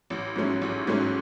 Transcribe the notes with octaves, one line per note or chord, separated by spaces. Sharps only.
A1
G#2 F#3 A3 C#4
A1
G#2 F#3 A3 C#4